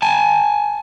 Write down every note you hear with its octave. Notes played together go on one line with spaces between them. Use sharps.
G#5 A5